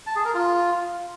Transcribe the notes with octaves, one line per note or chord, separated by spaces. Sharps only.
A5
G#4
A#4
F4